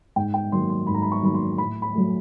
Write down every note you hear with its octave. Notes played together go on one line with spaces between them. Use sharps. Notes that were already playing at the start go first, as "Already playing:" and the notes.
G#2 G5
G5
D#3 F#3 A#3 C6
C6
G#2 B5
A#5
B5
C#6
D#3 F#3 A#3 B5
C6
A2 B5
B5
F#3 A3